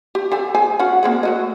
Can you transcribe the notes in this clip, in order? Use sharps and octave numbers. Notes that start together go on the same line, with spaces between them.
G4
G4 A4 G#5
G#4 C5 G#5
C#4 F#4 F#5
A#3 C4 G#4
A3 F#4 D#5